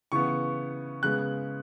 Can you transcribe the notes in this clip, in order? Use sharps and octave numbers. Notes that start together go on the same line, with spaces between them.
C#3 E3 B3 C#6
C#3 G#3 B3 F#6